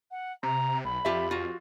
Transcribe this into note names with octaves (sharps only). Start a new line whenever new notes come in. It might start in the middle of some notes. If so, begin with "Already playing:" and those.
F#5
C3 A#5
B1 B5
F2 F4 G4 E5
F4 F#4